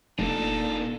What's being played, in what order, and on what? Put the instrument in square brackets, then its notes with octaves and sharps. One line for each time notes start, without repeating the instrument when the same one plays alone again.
[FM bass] F1 [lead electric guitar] A#2 [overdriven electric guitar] D4 D#4 [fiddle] A4